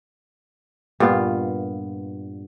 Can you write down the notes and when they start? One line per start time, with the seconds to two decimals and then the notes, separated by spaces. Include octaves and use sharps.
1.00 G2 A#2 B3 F4